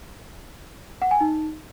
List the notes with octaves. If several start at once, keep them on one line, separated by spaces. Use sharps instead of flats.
F#5
G#5
D#4